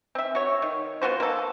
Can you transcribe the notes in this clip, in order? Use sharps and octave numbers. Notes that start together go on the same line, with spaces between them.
C4 E5
F#4 C#5
D#3
B3 F4 F#4 C5
A#3 A4